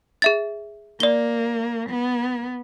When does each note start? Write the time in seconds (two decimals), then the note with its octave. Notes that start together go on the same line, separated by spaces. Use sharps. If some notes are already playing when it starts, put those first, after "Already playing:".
0.22 G#4 E5 A6
1.00 A#3 D5 G7
1.89 B3